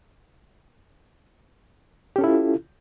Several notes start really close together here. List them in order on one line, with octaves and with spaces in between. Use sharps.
G4 C#4 A4 E4 F4